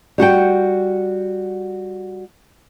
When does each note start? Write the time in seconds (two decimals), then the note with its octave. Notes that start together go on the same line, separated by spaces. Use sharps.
0.18 G3 F#4 F#5 G5